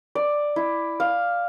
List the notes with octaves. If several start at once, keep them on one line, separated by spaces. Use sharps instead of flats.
D5
E4
F5